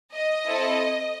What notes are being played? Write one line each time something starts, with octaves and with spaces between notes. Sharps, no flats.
D#5
C4 E4 A4